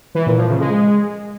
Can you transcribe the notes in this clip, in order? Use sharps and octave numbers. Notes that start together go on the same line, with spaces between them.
E3
A#2
F3
C#3
G#3